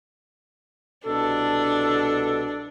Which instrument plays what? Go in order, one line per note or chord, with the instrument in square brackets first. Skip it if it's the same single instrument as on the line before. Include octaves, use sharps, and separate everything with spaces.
[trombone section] C2 B2 A4 [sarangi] D4